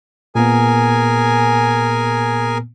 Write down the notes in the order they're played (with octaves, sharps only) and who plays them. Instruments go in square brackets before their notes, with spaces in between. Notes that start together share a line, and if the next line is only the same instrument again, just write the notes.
[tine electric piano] A#2 A#3 B3 [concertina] G#4 A#4 G#5